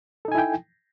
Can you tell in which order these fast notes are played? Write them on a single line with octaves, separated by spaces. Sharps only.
A4 D#4 G#5 E4 G5